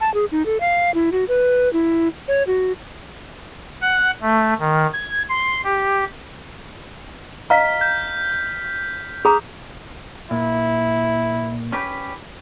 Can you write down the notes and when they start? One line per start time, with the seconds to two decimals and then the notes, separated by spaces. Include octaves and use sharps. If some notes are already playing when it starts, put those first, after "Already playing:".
0.01 A5
0.14 G#4
0.32 D#4
0.46 A4
0.60 F5
0.94 E4
1.12 F#4
1.28 B4
1.73 E4
2.28 C#5
2.47 F#4
3.81 F#5
4.22 A3
4.60 D#3
4.93 G#6
5.29 C6
5.64 G4
7.50 D#5 F5 A#5 F6 B6
7.81 G6
9.25 G#4 A#5 D#6
10.31 A#2 E4
11.72 C#4 G4 B4